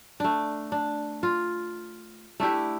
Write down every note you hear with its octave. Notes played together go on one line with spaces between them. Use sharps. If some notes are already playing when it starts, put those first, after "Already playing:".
A3 D4
D4
F4
A3 D4 E4 G4